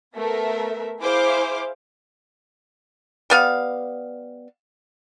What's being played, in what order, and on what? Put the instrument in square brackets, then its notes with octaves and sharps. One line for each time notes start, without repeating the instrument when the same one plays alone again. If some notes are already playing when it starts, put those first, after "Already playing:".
[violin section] A3 B3 A#4 E5
E4 G#4 C5 F5 D6
[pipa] G3 B3 F5